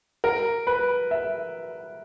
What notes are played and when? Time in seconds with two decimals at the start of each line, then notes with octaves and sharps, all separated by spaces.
0.24 A#4
0.67 B4
1.11 E5